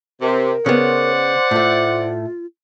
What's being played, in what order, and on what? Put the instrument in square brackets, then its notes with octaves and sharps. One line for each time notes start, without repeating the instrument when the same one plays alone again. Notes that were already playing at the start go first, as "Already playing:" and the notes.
[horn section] C3 [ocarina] A#4
[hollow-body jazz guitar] C#3 B3 [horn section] C5 D5 F#5
[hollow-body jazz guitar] A2 A3 [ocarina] F4